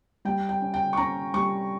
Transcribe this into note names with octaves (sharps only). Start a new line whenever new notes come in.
G3 G5
G5
C#4
G5
C#6
C#4 A#5
G3 C#6